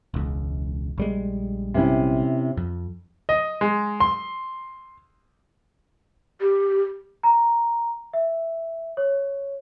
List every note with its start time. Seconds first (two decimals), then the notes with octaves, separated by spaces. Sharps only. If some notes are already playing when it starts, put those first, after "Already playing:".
0.14 E1 C#2
0.98 A#1 G3 G#3
1.74 C3 C#4 E4
2.57 F2
3.29 D#5
3.61 G#3
4.00 C6
6.41 G4
7.23 A#5
8.13 E5
8.97 C#5